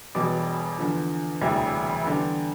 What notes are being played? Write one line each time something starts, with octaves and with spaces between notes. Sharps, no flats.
E1 E2 B2 G3 D6
E2 D3 F3
E1 D2 C3 E3 G3
E2 D3 G3